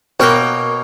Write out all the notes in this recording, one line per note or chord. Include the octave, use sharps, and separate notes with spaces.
B2 A#3 A#4 C#5 G5 F#6